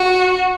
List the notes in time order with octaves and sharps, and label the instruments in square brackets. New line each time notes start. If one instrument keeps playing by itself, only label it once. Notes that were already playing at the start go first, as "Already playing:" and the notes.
Already playing: [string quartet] F#4